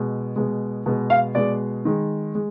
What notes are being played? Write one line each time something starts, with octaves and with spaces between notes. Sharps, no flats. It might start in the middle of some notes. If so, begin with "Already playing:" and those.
Already playing: B2 G#3
B2 G#3
B2 G#3
F5
B2 G#3 D5
D#3 G#3
G#3